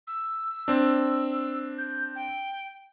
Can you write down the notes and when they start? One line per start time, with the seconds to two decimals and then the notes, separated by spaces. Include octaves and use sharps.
0.07 E6
0.68 C4 D4
1.78 G6
2.15 G5